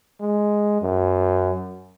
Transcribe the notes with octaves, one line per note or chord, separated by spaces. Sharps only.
G#3
F#2